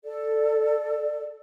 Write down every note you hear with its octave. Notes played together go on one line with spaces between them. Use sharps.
A4 D5